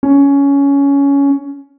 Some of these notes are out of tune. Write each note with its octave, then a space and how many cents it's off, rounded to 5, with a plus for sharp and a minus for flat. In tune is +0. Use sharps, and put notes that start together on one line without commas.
C#4 +15